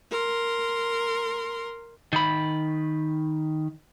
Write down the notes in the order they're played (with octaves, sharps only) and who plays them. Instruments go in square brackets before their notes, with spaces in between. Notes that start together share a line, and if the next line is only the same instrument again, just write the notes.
[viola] A#4 C6
[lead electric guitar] D#3 B5